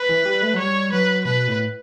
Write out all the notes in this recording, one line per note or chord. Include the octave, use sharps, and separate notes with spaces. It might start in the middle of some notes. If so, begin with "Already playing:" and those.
Already playing: B4
E3
G3
A3
F#3
G3 C#5
F#3 B4
B2 B4
A2